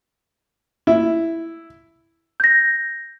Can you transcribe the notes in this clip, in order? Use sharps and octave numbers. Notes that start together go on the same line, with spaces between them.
E4
G6 A#6